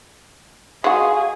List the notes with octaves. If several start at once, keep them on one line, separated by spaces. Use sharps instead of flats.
G#3 F#4 G#4 F5